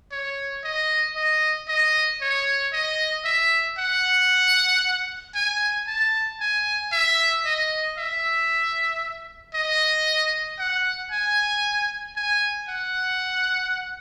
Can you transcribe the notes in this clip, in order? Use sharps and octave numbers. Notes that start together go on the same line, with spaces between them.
C#5
D#5
D#5
D#5
C#5
D#5
E5
F#5
G#5
A5
G#5
E5
D#5
E5
D#5
F#5
G#5
G#5
F#5